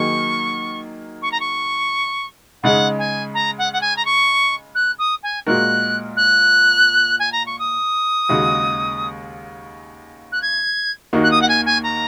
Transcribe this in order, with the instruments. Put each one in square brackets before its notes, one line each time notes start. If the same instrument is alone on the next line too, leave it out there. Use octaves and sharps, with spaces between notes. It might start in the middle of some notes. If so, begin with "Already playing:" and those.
Already playing: [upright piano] D#3 F#3 A#3 D#4 G#4 [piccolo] C#6
[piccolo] C#6
A#5
C#6
[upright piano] C#3 G#3 D#4 [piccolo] F#5
[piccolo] G#5
A#5
F#5
F#5
G#5
A#5
C#6
F#6
D#6
G#5
[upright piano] A#2 G#3 F#4 A#4 [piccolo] F#6
[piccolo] F#6
G#5
A#5
C#6
D#6
[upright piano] D#2 C#3 G#3 F#4
[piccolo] F#6
G#6
[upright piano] D#2 D#3 A#3 D#4 F#4
[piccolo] F#6
D#6
F#5
G#5
G#5
A#5